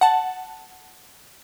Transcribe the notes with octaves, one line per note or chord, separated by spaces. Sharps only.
F#5 A5